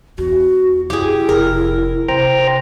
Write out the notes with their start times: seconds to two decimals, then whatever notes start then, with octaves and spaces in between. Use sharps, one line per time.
0.18 E2 F#4
0.90 F#2 E4 F4 G4 G#4
1.29 F1 A#4
2.09 C3 C5 G5 A#5